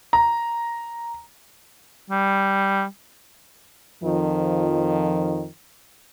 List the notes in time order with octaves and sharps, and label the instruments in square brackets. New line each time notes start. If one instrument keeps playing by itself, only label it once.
[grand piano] A#5
[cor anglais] G3
[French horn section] F2 D#3 F3